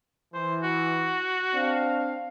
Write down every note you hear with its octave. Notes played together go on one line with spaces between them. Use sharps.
E3 C5
F#4
C4 D4 F5